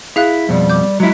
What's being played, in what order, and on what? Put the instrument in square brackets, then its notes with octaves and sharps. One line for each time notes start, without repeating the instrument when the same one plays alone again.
[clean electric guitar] E4 [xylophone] G#4 F5 F#6
[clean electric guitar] F2 B2 [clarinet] G3
[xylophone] D6 G6
[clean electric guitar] F#3 E4 [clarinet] G#3